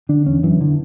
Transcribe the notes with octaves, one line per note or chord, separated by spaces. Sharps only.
D3 D4
E2 C#4
F#2 E3
D3